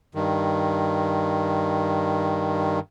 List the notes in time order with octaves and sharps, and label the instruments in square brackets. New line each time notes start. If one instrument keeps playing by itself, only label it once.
[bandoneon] G2 D#3